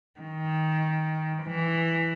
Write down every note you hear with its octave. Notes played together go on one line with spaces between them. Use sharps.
D#3
E3